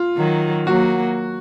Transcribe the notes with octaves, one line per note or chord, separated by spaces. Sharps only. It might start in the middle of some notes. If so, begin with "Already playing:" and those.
Already playing: F4
D#3 F#3
F#3 A#3 F#4